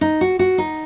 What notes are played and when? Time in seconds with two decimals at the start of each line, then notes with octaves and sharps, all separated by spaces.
0.01 D#4
0.21 F#4
0.39 F#4
0.58 D#4